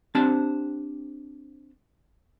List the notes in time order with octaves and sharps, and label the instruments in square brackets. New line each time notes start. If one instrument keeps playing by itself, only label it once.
[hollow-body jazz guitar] C4 D4 G4 C5 A5